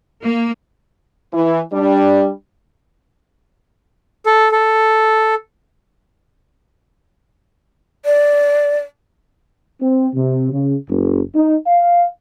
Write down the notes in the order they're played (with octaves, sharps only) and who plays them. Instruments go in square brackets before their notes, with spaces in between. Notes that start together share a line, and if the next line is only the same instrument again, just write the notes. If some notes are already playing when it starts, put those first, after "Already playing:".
[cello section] A#3
[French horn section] E3
G3 D4
[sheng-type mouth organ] A4
A4
[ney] D5
[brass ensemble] C4
C3
C#3
F#1
D#4
F5